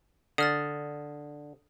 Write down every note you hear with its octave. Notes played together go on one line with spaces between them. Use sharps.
D3 D#6 F6 A6